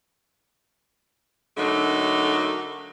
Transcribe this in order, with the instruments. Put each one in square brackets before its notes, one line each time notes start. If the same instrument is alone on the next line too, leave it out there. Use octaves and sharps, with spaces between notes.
[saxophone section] D3 F#3 A3 A#3 D#4